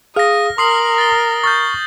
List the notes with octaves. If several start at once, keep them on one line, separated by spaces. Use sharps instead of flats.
G#4 F5 D#6 F6 A#6
A#4 C6 D#6 C7 F#7
A6 G7
C#6 F6 G6 A6